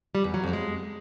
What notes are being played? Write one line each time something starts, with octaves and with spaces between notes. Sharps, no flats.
G3
E2
F#3
F2
G#3